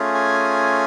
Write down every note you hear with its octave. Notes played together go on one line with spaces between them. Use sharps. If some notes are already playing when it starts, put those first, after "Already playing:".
Already playing: A3 C#4 F4 G#4
G#5